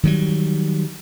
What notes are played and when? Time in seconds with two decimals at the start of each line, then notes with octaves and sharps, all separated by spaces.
0.03 D#3 F#3 G3